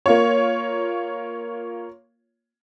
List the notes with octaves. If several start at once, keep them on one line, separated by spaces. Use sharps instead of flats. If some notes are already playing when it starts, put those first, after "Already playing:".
A#3 F4 C#5